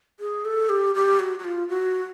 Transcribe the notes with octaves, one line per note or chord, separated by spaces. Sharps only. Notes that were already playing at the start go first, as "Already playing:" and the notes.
G#4
A4
G4
G4
F#4
F#4
F4
F#4